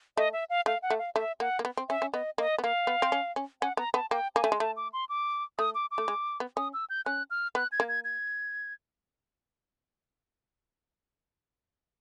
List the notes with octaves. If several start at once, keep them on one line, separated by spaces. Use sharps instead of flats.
A3 D#5
E5
F5
A3 F5
F#5
A3
F5
A3 E5
A#3 F#5
A#3
B3
C4
C#4 E5
C#4
B3 D#5
A#3 D#5
B3
A#3 F5
B3
C4
C#4
C#4
C#4 F#5
B3 A#5
B3 A5
A#3 G5
A#3 G#5
A3
G#3
A3 A5
D6
C6
D6
A3 D#6
D6
D6
A3
G#3
B3
C#4 D#6
E6
G6
C#4 F#6
F6
B3 F#6
G#6
A#3
G#6
G#6